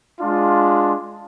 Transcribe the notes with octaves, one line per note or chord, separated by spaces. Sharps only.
G#3 D4 F4